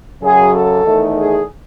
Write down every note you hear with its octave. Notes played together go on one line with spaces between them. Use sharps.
F#2 C#3 F#3 G#4
A4
E2 D#3 A3 D#4
G#4